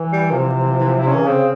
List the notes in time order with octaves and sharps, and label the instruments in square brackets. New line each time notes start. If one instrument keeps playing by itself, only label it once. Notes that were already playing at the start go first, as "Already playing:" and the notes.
Already playing: [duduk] E3
[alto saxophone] G3
[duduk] C3 [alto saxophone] F3
[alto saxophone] E3
F3
E3
F3
E3
F3
E4
C#4
[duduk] E3
C#3
[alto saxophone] C4
[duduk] C#3